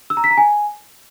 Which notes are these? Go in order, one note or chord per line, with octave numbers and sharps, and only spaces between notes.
E6
A#5
B6
A#5
G#5